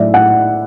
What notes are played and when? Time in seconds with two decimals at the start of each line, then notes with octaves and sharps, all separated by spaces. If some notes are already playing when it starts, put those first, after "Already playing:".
Already playing: A2 F#3 D5 E5
0.14 A2 F#5